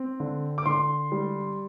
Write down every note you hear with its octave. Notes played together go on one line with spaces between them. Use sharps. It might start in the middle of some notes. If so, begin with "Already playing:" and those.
Already playing: C4
D3
D6
D3 C6
G3